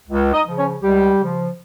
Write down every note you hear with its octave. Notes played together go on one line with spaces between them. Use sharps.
C#2
D#4 D#5
C#3 F3
C#4 C#5
C#2 G3 G4
C#3 F3